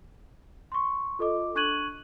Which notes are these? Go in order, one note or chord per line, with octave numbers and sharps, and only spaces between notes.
C6 C#6
F4 A4 D#5 D6
D4 C#6 F#6 G#6 D#7 F#7